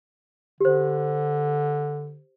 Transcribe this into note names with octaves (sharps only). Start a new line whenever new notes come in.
D3 G4 C5